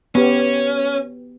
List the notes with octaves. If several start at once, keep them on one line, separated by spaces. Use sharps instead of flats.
B3 C#4 G4